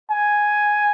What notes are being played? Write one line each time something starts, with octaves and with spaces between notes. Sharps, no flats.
G#5